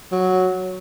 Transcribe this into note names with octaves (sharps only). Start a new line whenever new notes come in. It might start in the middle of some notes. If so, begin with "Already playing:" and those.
F#3